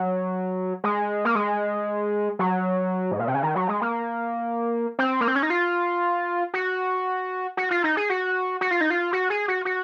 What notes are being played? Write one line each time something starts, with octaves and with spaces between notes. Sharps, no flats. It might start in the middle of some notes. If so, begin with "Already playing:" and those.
Already playing: F#3
G#3
A#3
G#3
F#3
G#2
A#2
C3
C#3
D#3
F#3
G#3
A#3
C4
A#3
C4
C#4
D#4
F4
F#4
F#4
F4
D#4
G#4
F#4
F#4
F4
D#4
F4
F#4
G#4
F#4
F#4